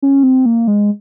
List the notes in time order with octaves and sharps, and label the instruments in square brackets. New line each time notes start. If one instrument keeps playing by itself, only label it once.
[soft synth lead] C#4
C4
A#3
G#3